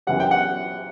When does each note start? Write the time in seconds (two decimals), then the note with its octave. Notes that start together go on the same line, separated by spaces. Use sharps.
0.07 F#2 E3 G3 F#5
0.20 G5
0.31 F#5